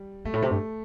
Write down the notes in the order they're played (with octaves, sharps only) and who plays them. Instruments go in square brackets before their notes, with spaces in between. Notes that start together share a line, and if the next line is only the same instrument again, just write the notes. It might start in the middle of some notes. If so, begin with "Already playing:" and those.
Already playing: [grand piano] G3
[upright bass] G2 [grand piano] A3
[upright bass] A2
C3
G2